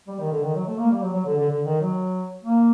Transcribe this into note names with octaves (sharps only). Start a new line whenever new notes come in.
G3
D#3
D3
D#3
F#3
A3
A#3
G3
F#3
F#3
D3
D3
D3
D#3
F#3
A#3